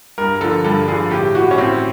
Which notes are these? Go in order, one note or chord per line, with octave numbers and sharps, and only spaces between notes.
G2 A#4
D3 F3 A4
G2 A4
D3 F3 G#4
A2 G4
E3 F#4
C#4
A2 C4